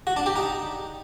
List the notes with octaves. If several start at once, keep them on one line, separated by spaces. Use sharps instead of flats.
F#4
D4
G4
D#4